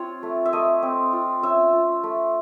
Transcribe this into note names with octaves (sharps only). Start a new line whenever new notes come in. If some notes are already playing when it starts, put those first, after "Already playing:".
Already playing: C4 F4 C#5
A3
E5
A3 D#5
C4
F4
C#4 E5
F4
A3